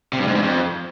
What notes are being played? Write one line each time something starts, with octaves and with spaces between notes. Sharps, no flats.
C3
G2
G#2
G2
F2